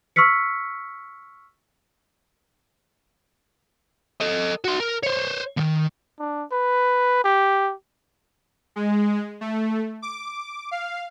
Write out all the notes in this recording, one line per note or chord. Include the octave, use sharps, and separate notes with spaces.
C#6 E6 F6 B6 C#7
A4 D#5
F#4 C6
A#4
C5 C#5
D#2 D#3
D4
B4
G4
G#3
A3
D6
F5